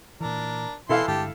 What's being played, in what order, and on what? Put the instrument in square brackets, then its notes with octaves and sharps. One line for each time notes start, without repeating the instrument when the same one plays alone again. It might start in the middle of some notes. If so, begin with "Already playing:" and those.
[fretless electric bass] A#2 E3 [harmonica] D4 A#4
[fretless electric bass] B2 [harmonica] E3 C6 [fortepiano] E4 A4 F5
[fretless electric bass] G2 D3 G#3 [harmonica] G4 A5